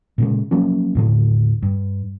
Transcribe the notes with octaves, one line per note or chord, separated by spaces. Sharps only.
A#2 C#3 G#3
F3 F#3 A#3 C#4
D#2 A2 D3
G2